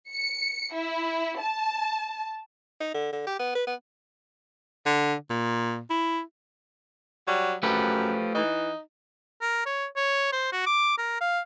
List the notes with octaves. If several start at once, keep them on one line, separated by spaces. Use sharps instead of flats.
C#7
E4
A5
D#4
D3
D3
G4
B3
B4
B3
D3
A#2
E4
F#3 G3
F#2 F3 A3 G4 B4
E3 D#4
A#4
C#5
C#5
C5
F#4
D6
A#4
F5